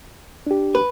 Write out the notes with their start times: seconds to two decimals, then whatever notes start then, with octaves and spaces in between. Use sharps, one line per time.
0.47 D4 G4
0.75 B4